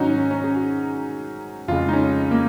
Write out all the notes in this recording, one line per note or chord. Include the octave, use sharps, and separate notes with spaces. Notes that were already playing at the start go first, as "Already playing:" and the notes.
Already playing: G#2 D#3 F#3 C#4 D#4 F#4
C#4
C#4
G#4
F#4
F2 C#3 G#3 F4
D#4
C#4
A#3